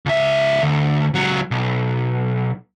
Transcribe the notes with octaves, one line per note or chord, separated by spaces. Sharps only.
C#2 E5
D2
C#2 F#3
B1